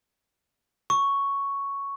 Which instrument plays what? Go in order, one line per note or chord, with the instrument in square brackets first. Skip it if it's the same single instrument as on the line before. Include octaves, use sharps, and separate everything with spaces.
[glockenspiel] C#6